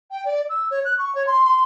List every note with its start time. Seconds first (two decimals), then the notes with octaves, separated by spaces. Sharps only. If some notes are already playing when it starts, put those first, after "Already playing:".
0.11 G5
0.25 D5
0.49 E6
0.71 C#5
0.85 F#6
0.98 C#6
1.15 C#5
1.27 C6
1.44 C6